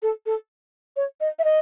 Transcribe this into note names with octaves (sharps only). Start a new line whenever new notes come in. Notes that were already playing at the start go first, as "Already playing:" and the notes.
A4
A4
C#5
D#5
E5
D#5